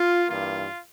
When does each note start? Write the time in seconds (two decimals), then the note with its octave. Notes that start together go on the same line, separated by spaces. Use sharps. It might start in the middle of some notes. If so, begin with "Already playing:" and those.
Already playing: F4
0.29 G2 E3 A#3 F4